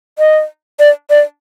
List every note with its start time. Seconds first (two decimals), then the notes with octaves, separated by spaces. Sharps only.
0.19 D#5
0.79 D5
1.10 D5